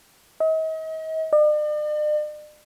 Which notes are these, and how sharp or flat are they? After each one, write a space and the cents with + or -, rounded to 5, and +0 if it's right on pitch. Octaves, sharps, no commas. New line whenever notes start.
D#5 +40
D5 +45